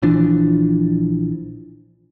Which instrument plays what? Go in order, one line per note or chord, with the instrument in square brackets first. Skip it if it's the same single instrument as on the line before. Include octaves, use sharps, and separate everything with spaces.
[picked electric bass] A#1 E3 F3 D4